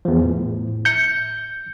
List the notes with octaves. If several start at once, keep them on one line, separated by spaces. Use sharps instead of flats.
E2 F3
A2
G6 C#7